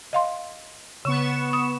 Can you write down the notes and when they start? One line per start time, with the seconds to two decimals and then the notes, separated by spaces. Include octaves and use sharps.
0.13 D#5 F5 C6
1.05 C#3 B3 C#6 E7
1.53 D#6